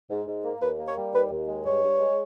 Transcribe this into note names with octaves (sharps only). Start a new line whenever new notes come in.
G#2
G#2
A#3
D#2 B4
A#3
C#5
G3
D#2 B4
D#2
G#3
G2 C#5
G2
G#3